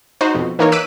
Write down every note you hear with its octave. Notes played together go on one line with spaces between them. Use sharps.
D#4 F#4 C5
F2 B2
E3 A#3 D#4 A#4 C#5
D6 E6 F#6 B6 D7 D#7